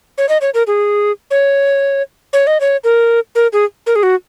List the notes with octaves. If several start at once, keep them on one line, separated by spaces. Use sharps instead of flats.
C#5
D#5
C#5
A#4
G#4
C#5
C#5
D#5
C#5
A#4
A#4
G#4
A#4
G#4
F#4